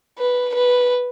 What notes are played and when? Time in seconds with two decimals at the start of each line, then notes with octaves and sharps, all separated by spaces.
0.18 B4
0.55 B4